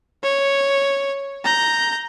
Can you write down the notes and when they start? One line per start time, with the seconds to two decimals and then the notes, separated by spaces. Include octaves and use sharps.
0.23 C#5
1.44 A#5 G6